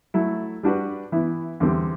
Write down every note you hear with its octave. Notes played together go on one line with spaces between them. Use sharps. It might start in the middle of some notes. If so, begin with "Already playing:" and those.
F#3 A3 E4 A4
G3 D4 F#4 B4
E3 B3 E4
E2 D3 G3 C4